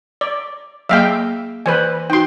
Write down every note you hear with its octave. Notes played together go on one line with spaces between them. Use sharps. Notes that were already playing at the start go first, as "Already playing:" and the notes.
D5
F#3 A#3 G#4 E5 F5 G5
E3 B4 C5 G#5
D#4 F#4 G5 C6